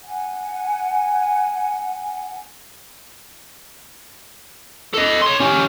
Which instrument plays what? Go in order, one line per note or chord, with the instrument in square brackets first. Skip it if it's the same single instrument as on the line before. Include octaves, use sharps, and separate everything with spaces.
[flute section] F#5 G#5
[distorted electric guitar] A4 D#5
C#5 C6
C#4 G4